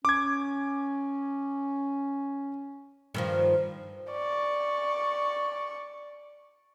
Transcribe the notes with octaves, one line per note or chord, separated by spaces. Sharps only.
C#4 D6 G#6
G2 D#3 F3
D5 C#6